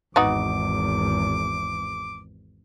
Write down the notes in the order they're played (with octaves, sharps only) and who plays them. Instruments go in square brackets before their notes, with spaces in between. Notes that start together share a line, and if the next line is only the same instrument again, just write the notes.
[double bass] G#1 E2 [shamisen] B3 D#4 F#4 [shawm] D6